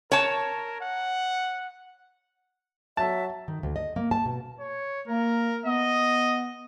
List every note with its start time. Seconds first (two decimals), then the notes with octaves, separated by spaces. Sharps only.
0.12 A#4 C#5 A5
0.80 F#5
2.97 F#3 E5 A5
3.48 D#3
3.63 D2
3.76 D#5
3.96 A#3
4.11 A5
4.25 B2
4.59 C#5
5.08 A#3 A#4
5.66 B3 D#5